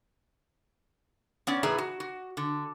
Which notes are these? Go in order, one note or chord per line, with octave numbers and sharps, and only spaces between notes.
B3 C#4 D5
A2 E3 G#4 B4 E5 A#5
F#4
F#4
D3